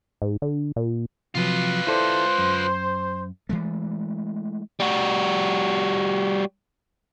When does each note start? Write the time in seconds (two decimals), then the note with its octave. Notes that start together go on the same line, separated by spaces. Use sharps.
0.22 G#2
0.42 D3
0.76 A#2
1.35 C3 F3 F#3 F4 B4
1.87 E4 A4 C5 D5
2.38 F#2
3.49 E3 G#3 A3
4.80 G3 F#4